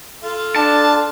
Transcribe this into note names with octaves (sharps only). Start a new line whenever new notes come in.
F4 A4
D4 A5